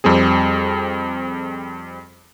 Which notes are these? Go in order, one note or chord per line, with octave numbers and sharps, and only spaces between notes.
F2 G3 C4 G#4